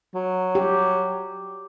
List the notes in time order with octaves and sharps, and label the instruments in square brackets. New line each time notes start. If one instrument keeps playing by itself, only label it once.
[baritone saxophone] F#3
[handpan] G4